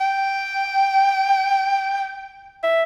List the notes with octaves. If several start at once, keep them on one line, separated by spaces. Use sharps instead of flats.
G5
E5